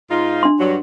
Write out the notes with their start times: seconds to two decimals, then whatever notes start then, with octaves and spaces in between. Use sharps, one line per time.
0.10 G#2 D#4 F4
0.43 D4 C6
0.60 G2 F#3